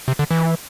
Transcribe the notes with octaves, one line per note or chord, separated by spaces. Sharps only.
C3
D3
E3